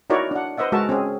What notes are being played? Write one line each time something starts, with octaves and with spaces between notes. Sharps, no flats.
D#4 E4 F#4 A#4 C#5 D5
D4 F#5
B4 C5 D#5 E5 F#5
G#3 F#4 A#4 E5 A5
C4 C#4 G#4